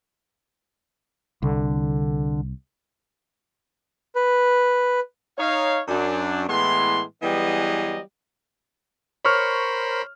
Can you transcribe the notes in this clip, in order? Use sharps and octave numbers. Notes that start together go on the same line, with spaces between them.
C2 D3
B4
D#4 C#5 F5
F#2 D4
A2 E3 G#3 B3 C6
E3 F#3 G3 B3 G#4 D#5
A#4 C5 C#5 B5 C#6 F6